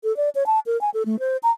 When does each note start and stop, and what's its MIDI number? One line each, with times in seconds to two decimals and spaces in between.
0.04 0.15 69
0.17 0.29 74
0.35 0.46 73
0.46 0.59 81
0.66 0.79 70
0.81 0.90 80
0.94 1.03 69
1.06 1.19 57
1.19 1.37 72
1.43 1.51 82